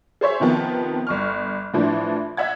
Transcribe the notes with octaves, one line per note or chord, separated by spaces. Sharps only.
G#4 C5 C#5 E5
C3 D#3 F3 B3
G1 C#6 F6
A2 E3 F3 D4
D#5 E5 F#5 G#6